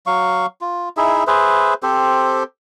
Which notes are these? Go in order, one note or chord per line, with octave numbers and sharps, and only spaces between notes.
F#3 F5 C#6
F4
D#4 E4 G#4 E5
G#4 B4 C5 E5
C4 G4 A4 C5